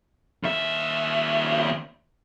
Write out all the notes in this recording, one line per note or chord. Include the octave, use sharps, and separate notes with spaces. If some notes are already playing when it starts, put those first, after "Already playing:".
D#2 E5